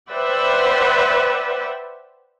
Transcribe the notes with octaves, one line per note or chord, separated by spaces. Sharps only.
B4 C5 D5 E5 F#5 G5